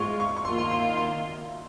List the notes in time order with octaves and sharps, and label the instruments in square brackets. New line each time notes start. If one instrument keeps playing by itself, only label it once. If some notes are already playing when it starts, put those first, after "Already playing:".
Already playing: [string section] G#2 G#3 F4 [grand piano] C6 C#6
[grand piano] C#6
C#6
[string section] D#3 A#3 F4 [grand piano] C6
[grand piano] C6
C6
C6